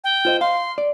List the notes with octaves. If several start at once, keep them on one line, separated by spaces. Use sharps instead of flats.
G5
F4 C5 D#5
F5 C6
D5